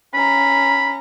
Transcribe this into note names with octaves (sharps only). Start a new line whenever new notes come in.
C#4 A#5 B5